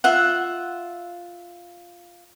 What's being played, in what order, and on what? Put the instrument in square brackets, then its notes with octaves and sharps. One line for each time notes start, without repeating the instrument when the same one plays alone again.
[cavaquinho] F4 E5 F#5